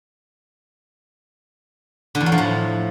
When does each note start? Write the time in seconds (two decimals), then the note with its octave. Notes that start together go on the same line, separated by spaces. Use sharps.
2.15 D3
2.21 E2
2.26 F#3
2.32 F3
2.38 A2